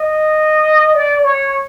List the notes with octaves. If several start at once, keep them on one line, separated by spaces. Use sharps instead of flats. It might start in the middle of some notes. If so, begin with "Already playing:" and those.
Already playing: D#5
D5
C#5